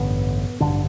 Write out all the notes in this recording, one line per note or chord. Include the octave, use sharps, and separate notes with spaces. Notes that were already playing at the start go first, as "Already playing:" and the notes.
Already playing: A1 G2 D3 B3
A1 G2 D3 D4